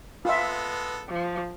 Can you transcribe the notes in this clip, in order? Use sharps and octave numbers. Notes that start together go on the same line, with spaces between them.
G#3 B3 F4 A4 E5
F3